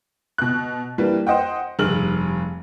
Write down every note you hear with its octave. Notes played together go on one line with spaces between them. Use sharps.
B2 F#6
E3 G3 A#3 D4 B4
C5 D#5 F#5 G5
F1 G2 G#4 F6 F#7